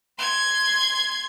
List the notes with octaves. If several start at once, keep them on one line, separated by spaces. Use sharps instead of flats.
C6 G#6